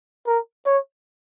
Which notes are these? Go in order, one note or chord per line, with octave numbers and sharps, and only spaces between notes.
A#4
C#5